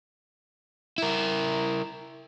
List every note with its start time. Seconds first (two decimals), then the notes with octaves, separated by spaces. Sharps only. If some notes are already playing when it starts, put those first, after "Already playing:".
0.98 E4 A#4